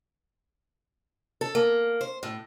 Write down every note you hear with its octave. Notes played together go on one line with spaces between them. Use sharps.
A4
A#3
C5
A2